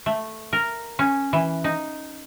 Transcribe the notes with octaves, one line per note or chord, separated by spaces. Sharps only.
A3
A#4
C#4
E3
D#4